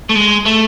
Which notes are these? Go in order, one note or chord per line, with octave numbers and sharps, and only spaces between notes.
A3
G#3
A3